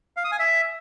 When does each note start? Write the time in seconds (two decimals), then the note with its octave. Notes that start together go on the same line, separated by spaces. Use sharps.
0.17 F5
0.24 D#6
0.32 G#5
0.39 E5